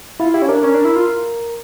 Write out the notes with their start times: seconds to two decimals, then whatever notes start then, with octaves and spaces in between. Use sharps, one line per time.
0.20 E4 F4
0.34 E4 G4
0.42 C#4
0.48 D4 A#4
0.63 C#4 A#4
0.74 D4
0.85 E4
0.96 F4